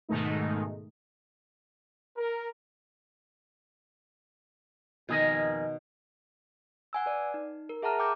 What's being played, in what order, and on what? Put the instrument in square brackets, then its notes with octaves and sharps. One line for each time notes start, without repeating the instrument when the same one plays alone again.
[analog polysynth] G#2 B2 D#3 G#3 A3 D#4
[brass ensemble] A#4
[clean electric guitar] F2 G#4 A#4 [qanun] B2 D#3 G#5
[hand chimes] F#5 G#5 E6
B4 D5
D#4
A#4
G#4 E5 F#5 A5 A#5 F6
G5 D6 G6